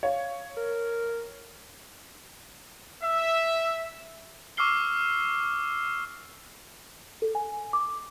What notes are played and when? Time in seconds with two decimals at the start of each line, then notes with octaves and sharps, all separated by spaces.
0.03 C#5 F5
0.57 A#4
3.03 E5
4.57 C#6 D6 E6 F6 C7 G7
7.22 A4
7.35 G#5
7.73 D6